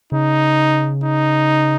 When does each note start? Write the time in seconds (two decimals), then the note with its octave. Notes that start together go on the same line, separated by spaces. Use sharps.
0.12 C#3 D#4
1.04 D#4